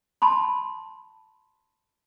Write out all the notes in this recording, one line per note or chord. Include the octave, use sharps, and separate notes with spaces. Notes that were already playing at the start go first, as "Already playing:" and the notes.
A5 B5 C6